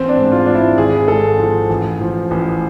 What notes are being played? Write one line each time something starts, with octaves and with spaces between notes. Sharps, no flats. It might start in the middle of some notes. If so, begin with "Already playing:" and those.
Already playing: A1 C4
D4
G#2
F4
G#2 D4
E4
G#1 G#4
G#2 A4
F3
A1
F3
A1